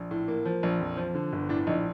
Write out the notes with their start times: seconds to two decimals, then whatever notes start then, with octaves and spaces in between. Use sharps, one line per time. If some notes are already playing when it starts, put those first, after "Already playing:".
Already playing: A#1
0.11 A2
0.28 A#3
0.46 F3
0.63 A#1
0.80 F2
0.97 F3
1.15 D3
1.33 G1
1.49 A2 D4
1.67 A#1 D#4